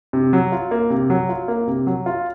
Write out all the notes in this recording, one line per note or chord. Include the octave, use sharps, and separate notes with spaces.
C3
F#3
F4
A#3
C3
F#3
F4
A#3
C3
F#3
F4